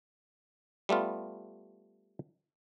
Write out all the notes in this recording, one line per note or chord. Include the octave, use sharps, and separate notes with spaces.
G3 A3 B3 F4